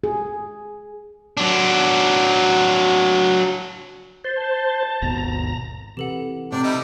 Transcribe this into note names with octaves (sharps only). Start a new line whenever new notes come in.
G#4
F#3 D4
C5 A6
A5
G#1 D#2 B2 A#5
C3 E3 G4 A4 B4 F#5
C3 D4
G3 D#4 E4 D#5